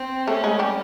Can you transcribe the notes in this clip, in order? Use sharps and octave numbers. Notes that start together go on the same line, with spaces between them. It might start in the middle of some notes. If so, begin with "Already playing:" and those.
Already playing: C4
A3 C#4 A4
G#3 G#4
G3 G4